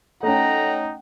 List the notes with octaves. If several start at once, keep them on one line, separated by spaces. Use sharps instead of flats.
A3 C#4 D#4 F#5 G5 A#5